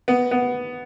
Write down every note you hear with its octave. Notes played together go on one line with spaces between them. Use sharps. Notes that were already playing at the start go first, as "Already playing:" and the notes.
B3
B3